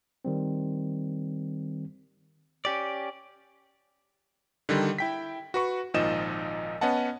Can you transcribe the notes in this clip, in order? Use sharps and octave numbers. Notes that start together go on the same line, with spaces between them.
D#3 G3 C4
C#4 G4 D5
D3 D#3 G3
E4 G5 B6
F#4 B4 C#6
G#1 A#2 F3 D#4 D#5 E7
B3 C#4 D#5 F#5 A5